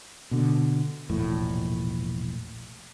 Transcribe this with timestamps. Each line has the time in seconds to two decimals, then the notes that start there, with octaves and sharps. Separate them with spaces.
0.31 B2 D3
1.09 E1 A#1 A2